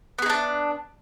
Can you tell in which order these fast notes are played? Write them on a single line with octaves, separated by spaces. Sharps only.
B3 G#4 D#4 D4